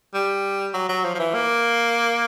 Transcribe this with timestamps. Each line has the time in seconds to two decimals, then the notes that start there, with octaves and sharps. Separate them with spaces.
0.14 G3
0.74 F#3
0.89 F#3
1.04 F3
1.15 F3
1.19 E3
1.34 A#3